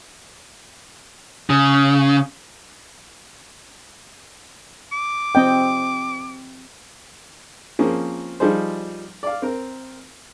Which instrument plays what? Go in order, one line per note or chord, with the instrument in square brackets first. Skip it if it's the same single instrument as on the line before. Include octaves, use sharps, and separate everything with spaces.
[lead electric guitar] C#3
[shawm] D6
[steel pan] C4 D#5 G5
[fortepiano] F3 A#3 C4 C#4 G#4
F3 G3 D#4 G#4 C5
D5 F5
C4 A#4